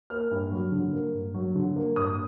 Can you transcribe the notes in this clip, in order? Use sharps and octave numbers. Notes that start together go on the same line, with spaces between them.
A#3 F6
G2
F#3
D3
A#3
G2
F#3
D3
A#3
G2 D#6